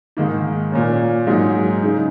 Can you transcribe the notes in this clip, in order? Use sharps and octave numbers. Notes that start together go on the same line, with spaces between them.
G#2 D#3 A#3 D#4
A#2 A#3 C#4
G#2 F#3 A#3 D#4
C#3 G#3 D#4